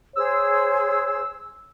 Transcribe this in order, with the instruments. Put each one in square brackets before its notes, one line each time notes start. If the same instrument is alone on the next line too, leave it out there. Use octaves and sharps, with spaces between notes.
[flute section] G#4 C5 [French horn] C#5 [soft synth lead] E6